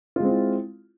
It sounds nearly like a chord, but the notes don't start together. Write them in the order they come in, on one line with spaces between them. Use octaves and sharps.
F4 G#3 C4 E4